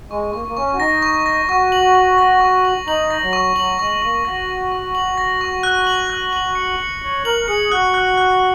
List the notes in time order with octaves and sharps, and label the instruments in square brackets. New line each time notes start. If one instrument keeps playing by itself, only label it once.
[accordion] G#3 [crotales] C#6
[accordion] A#3 [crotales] C#6
[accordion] A#3
[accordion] C#4 [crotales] C#6
[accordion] F#4
[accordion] D#4 [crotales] A#6
[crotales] C#6
A#6
[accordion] F#4 [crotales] C#6
[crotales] F#7
F#7
A#6
C#6
F#7
[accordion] D#4 [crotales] F#7
[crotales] A#6
[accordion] F#3
[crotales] C#6
[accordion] F#3 [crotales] F#7
[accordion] G#3 [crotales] C#6
[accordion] A#3 [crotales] C#6
[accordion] F#4 [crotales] A#6
[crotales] C#6
C#6
F#7
A#6
C#6
F#6
F#7
F#6
F#7
C#7
C#7
[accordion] C#5 [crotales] C#7
[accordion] A#4 [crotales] F#7
[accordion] G#4 [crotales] C#7
[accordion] F#4 [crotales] F#6
[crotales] F#6
F#6